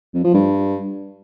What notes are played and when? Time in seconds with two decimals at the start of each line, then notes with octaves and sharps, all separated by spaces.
0.14 F2
0.24 F3
0.34 G2